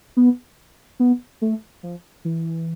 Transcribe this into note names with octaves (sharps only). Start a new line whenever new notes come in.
B3
B3
A3
F3
E3